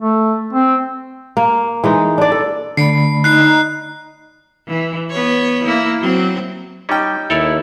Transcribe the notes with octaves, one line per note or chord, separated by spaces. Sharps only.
A3
C4
A#3
E3 G#3 D#4
D4 D5
A4
D3 A3 D5 B5 C7
D#4 F#6 C7
E3
B3 C#5
A#3 E4
F#3 C4
G3 C#4 D#4 G5
D#2 E4 A4 C#5 D5